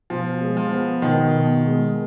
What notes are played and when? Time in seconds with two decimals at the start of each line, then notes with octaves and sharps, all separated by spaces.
0.10 B2 F3
0.41 G#3
0.57 F3
0.72 B3
1.02 B2 D#3
1.34 B2
1.64 G#3